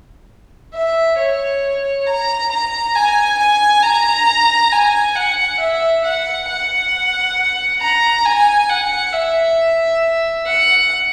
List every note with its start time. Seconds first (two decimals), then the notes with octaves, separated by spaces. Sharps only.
0.74 E5
1.18 C#5
2.07 A#5
2.51 A#5
2.95 G#5
3.39 G#5
3.83 A#5
4.72 G#5
5.16 F#5
5.60 E5
6.04 F#5
6.49 F#5
7.80 A#5
8.25 G#5
8.70 F#5
9.13 E5
10.46 F#5